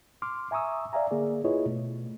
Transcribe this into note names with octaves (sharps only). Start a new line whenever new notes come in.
C6 D6 F6
E5 G#5 A#5 C#6 D#6 E6
D5 E5 F5 G#5 A#5
D3 A#3 G#4 D5
E4 F4 G#4 B4 C#5 D#5
B2 A3